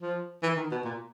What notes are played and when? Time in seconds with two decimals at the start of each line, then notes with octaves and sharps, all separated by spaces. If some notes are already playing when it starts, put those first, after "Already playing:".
0.02 F3
0.43 E3
0.57 D#3
0.71 B2
0.84 A#2